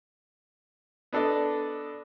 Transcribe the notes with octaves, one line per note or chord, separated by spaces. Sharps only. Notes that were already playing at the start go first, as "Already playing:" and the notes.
B3 D4 A4 D5 D#5